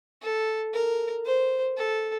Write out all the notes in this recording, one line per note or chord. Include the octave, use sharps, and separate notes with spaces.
A4
A#4
C5
A4